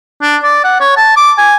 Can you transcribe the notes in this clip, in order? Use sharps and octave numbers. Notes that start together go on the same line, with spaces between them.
D4
D5
F#5
C#5
A5
D6
G#5